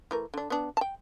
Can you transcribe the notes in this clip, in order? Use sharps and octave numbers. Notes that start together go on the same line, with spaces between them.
E3 A3 A#4
D3 D4
B3 D4
G5 A5